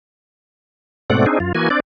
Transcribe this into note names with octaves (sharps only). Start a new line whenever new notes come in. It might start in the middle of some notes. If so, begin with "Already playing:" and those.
G#2 B2 A3 C4 D5 F#5
C4 D4 D#4 G#4
F#2 F4
E3 A#3 F#4 G#5
C4 D4 D5